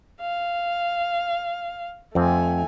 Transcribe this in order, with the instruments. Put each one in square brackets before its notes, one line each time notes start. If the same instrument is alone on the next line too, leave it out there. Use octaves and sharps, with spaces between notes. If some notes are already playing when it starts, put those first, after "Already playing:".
[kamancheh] F5
[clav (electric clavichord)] F2 C4 [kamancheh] A3 G#5